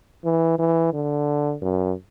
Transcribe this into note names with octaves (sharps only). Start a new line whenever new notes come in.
E3
E3
D3
F#2